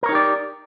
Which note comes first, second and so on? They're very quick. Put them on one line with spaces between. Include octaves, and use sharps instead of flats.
A#4 C#5 D#4 G4 D5